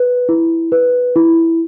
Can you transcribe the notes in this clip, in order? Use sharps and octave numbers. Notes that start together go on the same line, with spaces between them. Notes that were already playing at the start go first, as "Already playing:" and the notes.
Already playing: B4
E4
B4
E4